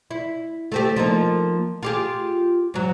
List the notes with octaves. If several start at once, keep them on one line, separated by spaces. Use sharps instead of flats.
E4
A3 C4 G4
F3 A#3 D#4
F4 G4 G#4
G#2 F#3